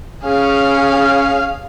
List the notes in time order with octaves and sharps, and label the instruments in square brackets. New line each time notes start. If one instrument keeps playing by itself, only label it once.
[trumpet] C#4 [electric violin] G#4 F5